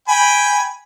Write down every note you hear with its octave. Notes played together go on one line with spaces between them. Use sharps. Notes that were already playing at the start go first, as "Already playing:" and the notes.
G5 G#5 B5